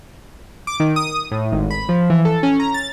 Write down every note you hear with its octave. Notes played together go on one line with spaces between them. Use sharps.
D6
D#3
D#6
A2
G#1
B5
F3
E3
A4
C#4
A#5
A6